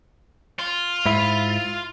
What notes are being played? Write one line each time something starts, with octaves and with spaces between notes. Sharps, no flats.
F4
G#2 E4 E5